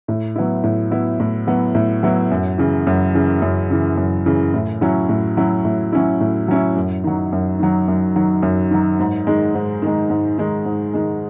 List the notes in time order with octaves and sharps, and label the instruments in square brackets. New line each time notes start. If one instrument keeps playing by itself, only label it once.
[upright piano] A2
F#3 B3 E4
A2
F#3 B3 E4
A2
F#3 B3 E4
A2
F#3 B3 E4
F#2
C#3 E3
F#2
C#3 E3
F#2
C#3 E3
F#2
C#3 E3
A2
F#3 C#4 E4
A2
F#3 C#4 E4
A2
F#3 C#4 E4
A2
F#3 C#4 E4
F#2
D#3 F#3
F#2
D#3 F#3
F#2
D#3 F#3
F#2
D#3 F#3
G#2
D#3 G#3
G#2
D#3 G#3
G#2
D#3 G#3
G#2
D#3 G#3